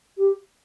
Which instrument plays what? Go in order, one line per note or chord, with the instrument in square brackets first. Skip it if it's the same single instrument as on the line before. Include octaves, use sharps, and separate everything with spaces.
[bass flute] G4